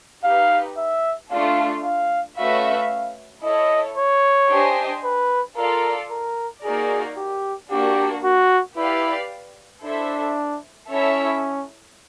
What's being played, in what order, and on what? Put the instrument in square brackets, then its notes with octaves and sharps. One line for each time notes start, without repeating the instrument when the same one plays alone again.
[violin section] D#4 G4 B4 [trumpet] F5
[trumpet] E5
[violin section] A3 D4 F4 [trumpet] F5
[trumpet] F5
[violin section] A3 C#4 F#4 B4 E5 [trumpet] F5
[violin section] E4 A4 C#5 [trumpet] D#5
[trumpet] C#5
[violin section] D4 G4 C5 D#5 G#5
[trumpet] B4
[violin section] F4 A4 D5 F5 [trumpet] A#4
[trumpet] A#4
[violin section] A#3 D#4 F#4 A#4 D5 [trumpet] G#4
[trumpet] G4
[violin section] A#3 D4 F#4 [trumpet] G4
[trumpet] F#4
[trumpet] E4 [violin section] G4 B4 D5 F5
[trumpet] D4 [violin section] E4 A4 C5 E5
[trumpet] C#4 [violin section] E4 A4 C#5 E5